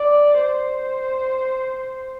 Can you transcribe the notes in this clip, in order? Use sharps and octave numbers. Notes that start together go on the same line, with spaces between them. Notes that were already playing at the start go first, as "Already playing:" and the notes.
Already playing: D5
C5